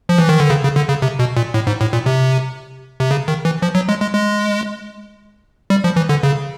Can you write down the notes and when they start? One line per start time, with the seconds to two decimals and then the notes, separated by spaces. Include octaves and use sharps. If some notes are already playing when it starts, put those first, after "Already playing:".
0.09 F3
0.18 E3
0.29 D#3
0.40 D3
0.50 C#3
0.63 C#3
0.76 D3
0.89 C#3
1.02 C3
1.19 B2
1.37 A#2
1.54 A2
1.67 G#2
1.81 A2
1.93 A#2
2.06 C3
3.00 C3
3.11 C#3
3.28 D#3
3.45 E3
3.62 F3
3.75 F#3
3.89 G#3
4.01 G#3
4.14 G#3
5.70 G3
5.84 F3
5.96 E3
6.09 D3
6.23 C#3